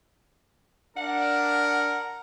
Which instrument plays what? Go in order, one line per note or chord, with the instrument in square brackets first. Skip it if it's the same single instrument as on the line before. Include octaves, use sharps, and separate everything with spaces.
[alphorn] D4 [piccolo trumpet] A#4 [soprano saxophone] F#5